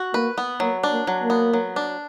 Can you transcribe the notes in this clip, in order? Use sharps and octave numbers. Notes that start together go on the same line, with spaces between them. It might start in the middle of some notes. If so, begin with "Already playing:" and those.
Already playing: F#4
A#3 B4
B3
F#3 A#3
D4
A#3
F#3
A#3
B3
F#3
D4